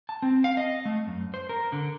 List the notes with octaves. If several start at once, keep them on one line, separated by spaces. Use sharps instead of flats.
A5
C4
F5
D#5
A3
F#2
C5
A#4
D3